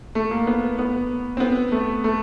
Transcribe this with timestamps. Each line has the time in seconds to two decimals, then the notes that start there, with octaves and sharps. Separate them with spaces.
0.15 A3
0.31 A#3
0.47 B3
0.79 B3
1.37 C4
1.40 B3
1.72 A3
2.04 A3